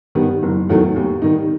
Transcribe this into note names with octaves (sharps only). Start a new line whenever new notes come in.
G2 D#3 G3 B3
F#1
E2 D#3 F#3 A3
D#2
D#3 G3 D#4